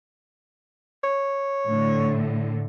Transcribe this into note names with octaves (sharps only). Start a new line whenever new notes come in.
C#5
A2 D3